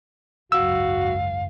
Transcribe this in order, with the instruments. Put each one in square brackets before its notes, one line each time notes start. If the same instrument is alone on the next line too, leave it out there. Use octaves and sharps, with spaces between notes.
[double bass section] G#1 C#2 F#2 [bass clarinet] F#4 [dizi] F5 [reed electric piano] E6